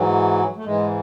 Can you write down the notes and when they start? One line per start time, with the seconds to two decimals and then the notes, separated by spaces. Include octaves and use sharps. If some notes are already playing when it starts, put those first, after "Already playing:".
Already playing: G#2 E3 F#3
0.56 A3
0.65 G#2 E3 G#3